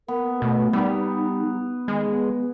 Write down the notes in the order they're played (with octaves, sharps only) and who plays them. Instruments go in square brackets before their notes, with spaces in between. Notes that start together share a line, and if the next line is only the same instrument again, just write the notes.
[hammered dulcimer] B3 [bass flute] A#4
[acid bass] B2 [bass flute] A3
[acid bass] G3 [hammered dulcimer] B3 [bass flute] D#4
[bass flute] D#3 [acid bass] G#3
[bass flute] B3